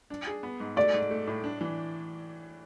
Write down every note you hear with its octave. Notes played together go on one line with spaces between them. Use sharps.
D4
G#4
B3
G#2
A3 D5
G#2
A3
A2
D4
E3